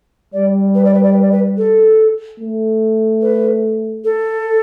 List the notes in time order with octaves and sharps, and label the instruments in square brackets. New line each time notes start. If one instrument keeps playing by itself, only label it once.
[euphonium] G3 [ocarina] D5
[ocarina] B4
D5
B4
D5
B4
D5
B4
A4
[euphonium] A3
[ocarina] B4
A4